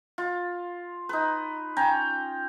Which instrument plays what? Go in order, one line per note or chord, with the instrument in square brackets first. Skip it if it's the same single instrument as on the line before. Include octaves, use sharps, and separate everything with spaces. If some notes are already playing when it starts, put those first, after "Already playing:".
[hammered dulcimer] F4
D#4 B4
C#4 G5 A#5